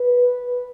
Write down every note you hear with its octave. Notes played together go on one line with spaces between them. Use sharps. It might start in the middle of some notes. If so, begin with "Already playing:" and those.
Already playing: B4